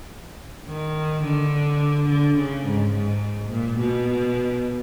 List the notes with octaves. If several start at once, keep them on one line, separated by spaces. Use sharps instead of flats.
D#3
D3
D3
C#3
G#2
G#2
A#2
B2